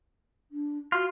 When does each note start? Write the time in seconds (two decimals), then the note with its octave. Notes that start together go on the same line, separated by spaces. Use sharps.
0.51 D4
0.92 F4 F#4